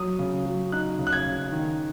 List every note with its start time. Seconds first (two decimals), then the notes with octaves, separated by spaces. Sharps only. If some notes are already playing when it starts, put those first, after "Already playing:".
Already playing: F#3 D#6
0.19 C#3
0.46 F#3
0.72 D#4 F#6
0.99 C#3
1.07 F#6
1.13 G#6
1.26 C#3
1.52 D#3